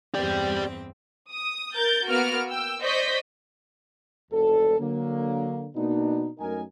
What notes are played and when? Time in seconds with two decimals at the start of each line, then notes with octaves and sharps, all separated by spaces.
0.15 E2 G2 C4 G4 D5
1.31 D#6
1.75 A#4 G6 A6
2.08 A#3 B3 F#4 F6 D7
2.49 G5 E6
2.81 C5 D5 D#5 C#6 G6 B6
4.31 F#1 D2 A4
4.79 D3 F#3 A#3
5.75 B2 A#3 B3 D4 D#4
6.39 F#2 A3 D#4 A#4 G#5